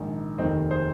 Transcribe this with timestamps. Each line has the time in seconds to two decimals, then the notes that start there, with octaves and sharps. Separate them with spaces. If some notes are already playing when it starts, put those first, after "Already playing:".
Already playing: A#1 G#2 D#3
0.38 F1 D#2 D#3 C4 D#4
0.71 G#4 C5